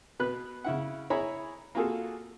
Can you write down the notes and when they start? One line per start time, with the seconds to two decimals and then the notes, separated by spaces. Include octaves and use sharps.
0.19 B2 B3 B4 F#6
0.64 C#3 E4 F#5
1.10 E4 G#4 C#5 A#5 B5
1.75 A#3 F4 F#4 G#4 A4